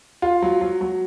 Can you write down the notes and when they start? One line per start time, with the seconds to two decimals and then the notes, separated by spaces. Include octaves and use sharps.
0.22 F4
0.42 F#3
0.61 F#3
0.81 F#3